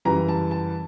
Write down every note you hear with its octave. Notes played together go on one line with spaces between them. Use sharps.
F#2 C#3 E3 G3 A#5
A5
A5